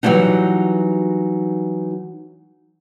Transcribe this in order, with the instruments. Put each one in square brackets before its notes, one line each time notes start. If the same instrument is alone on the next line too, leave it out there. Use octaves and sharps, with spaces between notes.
[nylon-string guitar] E3 F#3 G3 A#3 D4 D#4